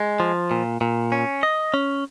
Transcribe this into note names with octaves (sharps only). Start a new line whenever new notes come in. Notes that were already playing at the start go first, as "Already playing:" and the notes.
Already playing: G#3
F3
A#2
A#2
C#4
D#5
C#4